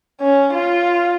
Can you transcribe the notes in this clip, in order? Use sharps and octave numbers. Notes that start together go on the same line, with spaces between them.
C#4
F4